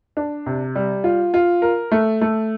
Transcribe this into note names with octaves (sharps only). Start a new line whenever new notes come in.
D4
C3
G3
F4
F4
A#4
A3
A3